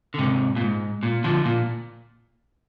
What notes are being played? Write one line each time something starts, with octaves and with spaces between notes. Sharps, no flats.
D3
G#2 C3
A#2
G#2
A#2
D3 F3
A#2